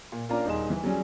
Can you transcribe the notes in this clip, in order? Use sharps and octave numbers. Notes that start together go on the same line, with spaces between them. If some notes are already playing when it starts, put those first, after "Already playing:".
A#2
A#3 C#4 D4 F4 D5 A#5
D#1 D#4 G#4 C6 E7
E3
F#3 G3 C#4 G#4